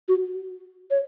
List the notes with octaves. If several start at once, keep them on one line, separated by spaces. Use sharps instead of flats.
F#4
C#5